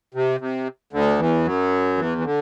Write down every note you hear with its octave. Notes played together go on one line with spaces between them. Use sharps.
C3
C3
D2 D3
E2 E3
F#2 F#3
E2 E3
E3
D3